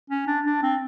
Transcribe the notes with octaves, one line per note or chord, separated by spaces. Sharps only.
C#4
D4
D4
C4